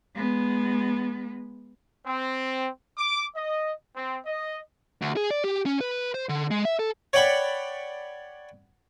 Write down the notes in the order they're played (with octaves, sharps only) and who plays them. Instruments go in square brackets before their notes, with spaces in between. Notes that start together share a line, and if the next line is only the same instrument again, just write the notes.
[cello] G#3 B3
[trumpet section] C4
D6
D#5
C4
D#5
[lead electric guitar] D2
G#4
D5
G4
C#4
B4
C5
D3
G#3
E5
A4
[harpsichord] C#5 D5 F#5 G5 B5 C#6